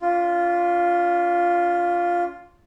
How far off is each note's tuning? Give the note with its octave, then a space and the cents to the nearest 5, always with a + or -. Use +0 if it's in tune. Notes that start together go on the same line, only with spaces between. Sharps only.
C#4 +45 F4 +0